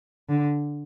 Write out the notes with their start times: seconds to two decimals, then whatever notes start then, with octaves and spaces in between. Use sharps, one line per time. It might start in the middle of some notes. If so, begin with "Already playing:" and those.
0.29 D3